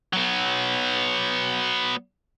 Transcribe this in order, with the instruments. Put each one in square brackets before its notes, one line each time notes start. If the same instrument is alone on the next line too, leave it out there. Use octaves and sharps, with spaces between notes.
[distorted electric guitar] F#3 B3